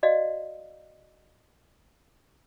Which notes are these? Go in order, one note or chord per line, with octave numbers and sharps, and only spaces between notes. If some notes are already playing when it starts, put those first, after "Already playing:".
F#4 D5 D#5 F5